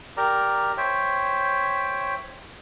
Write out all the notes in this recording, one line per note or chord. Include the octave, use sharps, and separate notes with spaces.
G4 A#4 D5 A#5
C5 C#5 E5 G5